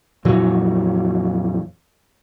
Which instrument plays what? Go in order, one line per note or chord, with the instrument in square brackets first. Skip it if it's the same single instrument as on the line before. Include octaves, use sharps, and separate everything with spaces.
[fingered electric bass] F2 A#2 E3 F#3